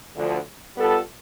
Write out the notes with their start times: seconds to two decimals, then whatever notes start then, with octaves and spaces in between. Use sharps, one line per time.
0.16 D2 D3 F3
0.77 G3 B3 F4 A4